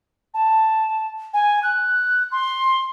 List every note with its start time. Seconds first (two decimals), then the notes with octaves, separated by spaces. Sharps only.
0.34 A5
1.34 G#5
1.63 F#6
2.32 C6